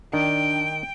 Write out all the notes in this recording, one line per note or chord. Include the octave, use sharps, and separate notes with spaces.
D#3 D4 G5